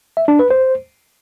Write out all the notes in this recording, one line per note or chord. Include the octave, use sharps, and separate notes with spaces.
E5
D4
B4
C5